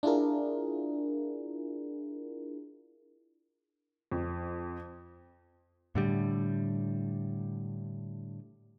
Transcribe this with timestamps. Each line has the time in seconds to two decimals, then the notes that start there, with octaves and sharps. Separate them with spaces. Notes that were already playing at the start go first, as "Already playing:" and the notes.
0.03 D4 E4 F4 G#4 A#4
4.12 F2
5.95 A2 D3 G3